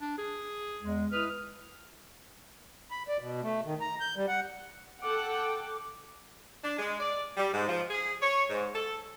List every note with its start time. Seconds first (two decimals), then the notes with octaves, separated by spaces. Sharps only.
0.01 D4
0.18 G#4
0.81 E2 G#3
1.12 E4 B4 D#6 F6
2.91 B5
3.08 D5
3.20 B2
3.43 A3
3.65 D#3
3.80 A#5
4.01 G6
4.16 G3
4.28 F#5
5.02 A4 F#5 G5 D6
6.63 D4
6.79 G#3
7.00 D5
7.37 G3
7.53 G#2
7.67 F3
7.90 G#4
8.21 C#5
8.50 G#2
8.75 A4